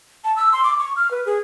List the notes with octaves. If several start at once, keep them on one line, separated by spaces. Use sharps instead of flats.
A5
E6
C6
D6
C#6
F6
B4
G#4